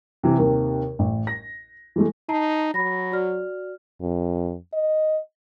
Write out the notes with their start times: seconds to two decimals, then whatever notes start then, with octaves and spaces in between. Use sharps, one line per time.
0.23 C3 E3
0.38 D#2 C3 D#3
0.99 A1
1.27 A#6
1.96 E3 G#3 A3
2.29 D#4 A5 A#5 C7
2.74 F#3 B5 A#6
3.12 F#4 D5 F6
4.01 F2
4.73 D#5